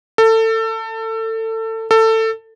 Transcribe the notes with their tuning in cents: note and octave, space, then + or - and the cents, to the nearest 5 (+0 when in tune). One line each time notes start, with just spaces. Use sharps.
A4 +25
A4 +20